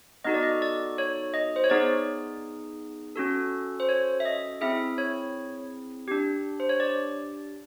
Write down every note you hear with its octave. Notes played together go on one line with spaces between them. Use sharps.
B3 D#4 F#4 A4 D#5
D5
D#5
D5
C#5
D#5
C5
C#5
B3 D#4 G#4 D5
C#4 F#4 A4
C5
C#5
E5
D#5
C4 E4 G#4 E5
C#5
D4 G4
C5
C#5
D5